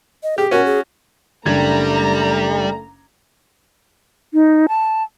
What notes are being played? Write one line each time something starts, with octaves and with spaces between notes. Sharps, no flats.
D#5
G4 G#4
C#4 F#4 A#4
G#4
F#1 G3 A3 D4 A#5 G#6
D#4
A5